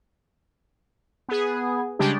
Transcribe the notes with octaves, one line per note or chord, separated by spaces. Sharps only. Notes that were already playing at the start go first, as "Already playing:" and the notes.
B3 G#4
C#3 G3 G#3 D4 G4